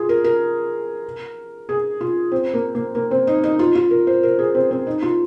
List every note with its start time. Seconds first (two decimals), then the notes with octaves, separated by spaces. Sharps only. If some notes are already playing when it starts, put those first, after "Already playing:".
Already playing: F4 G#4
0.09 A#4
0.24 A#4
1.69 G#4
2.01 F4
2.32 C4
2.54 A#3
2.75 A#3
2.95 A#3
3.11 C4
3.27 D#4
3.43 D#4
3.59 F4
3.75 F4
3.91 A#4
4.07 C5
4.23 A#4
4.39 G#4
4.55 C4
4.71 C4
4.87 D#4
5.02 F4